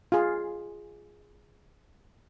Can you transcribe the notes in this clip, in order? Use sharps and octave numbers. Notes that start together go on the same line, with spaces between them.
F4 G#4